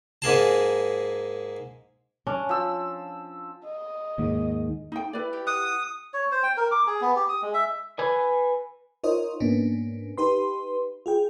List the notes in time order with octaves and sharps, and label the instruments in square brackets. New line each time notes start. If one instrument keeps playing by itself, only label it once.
[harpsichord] G#2 A#3 G#4 A5
[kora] C#4 D4
[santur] F3 E6
[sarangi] D#5
[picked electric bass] D#2 G#2
[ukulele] D#4 G5
E4 B4 D5
[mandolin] G4
[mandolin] F#5 [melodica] D#6
[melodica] C#5
C5
G5
A#4
D6
G#4
B3
G4
D#6
G#3
E5
[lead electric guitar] B4 G#5
[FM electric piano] D#4 F4 A#4 C5 C#5 D#5
G#2 A#3 B3 C#4 D4
D#4 G4 B4 C6
F4 G#4 G5